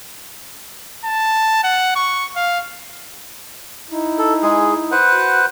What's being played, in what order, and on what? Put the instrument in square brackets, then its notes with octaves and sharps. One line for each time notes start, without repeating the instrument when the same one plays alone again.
[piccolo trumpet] A5
F#5
C#6
F5
[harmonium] D#4 E4
[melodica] A4
G#3 G#4
B4 C5 F#5
[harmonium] F#4